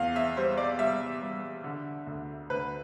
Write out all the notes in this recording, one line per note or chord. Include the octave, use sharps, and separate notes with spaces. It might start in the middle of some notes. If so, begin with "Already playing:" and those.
Already playing: E2 F5
E5
G3 C5
D5
G3 E5
G3
D3
D2
D2 B4